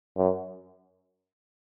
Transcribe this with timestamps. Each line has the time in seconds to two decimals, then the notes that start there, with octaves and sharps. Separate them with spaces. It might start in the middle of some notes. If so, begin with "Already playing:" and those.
0.17 F#2